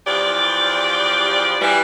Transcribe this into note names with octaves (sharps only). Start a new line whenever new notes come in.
E2 F3 G4 D5
E3 G3